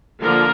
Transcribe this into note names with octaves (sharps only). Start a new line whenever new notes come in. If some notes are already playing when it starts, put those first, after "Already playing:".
D3 F3 A#3 A#4